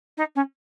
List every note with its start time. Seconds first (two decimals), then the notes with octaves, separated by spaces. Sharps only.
0.17 D#4
0.35 C#4